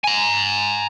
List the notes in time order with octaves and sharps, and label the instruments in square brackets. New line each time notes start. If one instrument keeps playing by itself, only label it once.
[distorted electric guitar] G#5 A#5